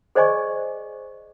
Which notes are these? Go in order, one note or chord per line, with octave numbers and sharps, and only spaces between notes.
G#4 C5 D5 D#5 G#5 C#6